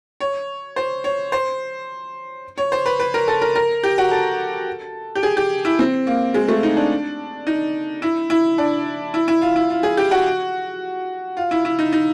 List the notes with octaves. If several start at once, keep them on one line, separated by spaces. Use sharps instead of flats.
C#5
C5
C#5
C5
C#5
C5
B4
B4
A#4
A4
A#4
A#4
G4
F#4
A4
G4
G#4
G4
E4
C4
A#3
G#3
A3
D#4
D4
D#4
E4
E4
D4
E4
E4
F4
E4
F4
G#4
G4
F#4
F4
E4
E4
D#4
D#4